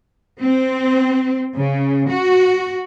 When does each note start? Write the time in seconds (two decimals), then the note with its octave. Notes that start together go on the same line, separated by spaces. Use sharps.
0.40 C4
1.57 C#3
2.10 F#4